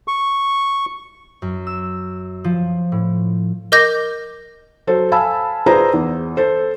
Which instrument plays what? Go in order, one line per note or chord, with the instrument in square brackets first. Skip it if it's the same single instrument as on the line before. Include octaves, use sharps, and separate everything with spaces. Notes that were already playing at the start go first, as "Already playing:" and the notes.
[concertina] C#6
[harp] F#2
E6
F3
A2
[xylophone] A#4 D#5 D6 G6 A#6
[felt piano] F#3 A4 C5
F5 G#5 A5 B5 E6
F4 G#4 B4 C5 D5 A#5
E2
A4 C5